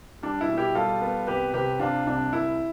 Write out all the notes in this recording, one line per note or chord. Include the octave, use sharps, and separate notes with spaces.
G3 D4
E4
B2
E4 G4
G3 F4 A4
B3
C2 G4 B4
C3 G4 B4
C3 D4 F4
C2 D4
C2 E4